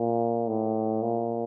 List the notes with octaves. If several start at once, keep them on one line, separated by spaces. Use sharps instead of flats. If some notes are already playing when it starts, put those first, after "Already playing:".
Already playing: A#2
A2
A#2